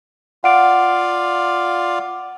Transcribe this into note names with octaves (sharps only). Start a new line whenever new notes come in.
F4 D5 F5 F#5 D7